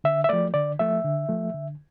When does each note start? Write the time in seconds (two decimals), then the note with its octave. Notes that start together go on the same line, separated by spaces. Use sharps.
0.04 D3 E5
0.24 E5
0.29 F3 A3 D5
0.54 D3 D5
0.79 F3 A3 E5
1.04 D3
1.29 F3 A3
1.54 D3